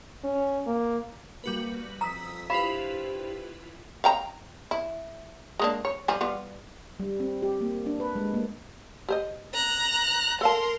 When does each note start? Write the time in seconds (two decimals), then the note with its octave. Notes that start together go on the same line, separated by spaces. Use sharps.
0.24 C#4
0.67 A#3
1.44 G3 A#3 F#4 B4
2.01 F2 A#5 D#6 E6 B6
2.50 G2 E4 F4 G4 B4 C5 F5 B5
4.04 F5 G5 A#5
4.71 E4
5.59 G#3 A#3 D4
5.85 C#5
6.08 F3 G3 G#5
6.21 G3 B3 F4
7.00 G3
7.20 C4
7.42 G4
7.61 A#3
7.86 D4
8.00 B4
8.16 G#3
8.34 A#3
9.09 G4 C5 D#5
9.54 A#5 F#6
10.41 A4 A#4 F5 A5 C6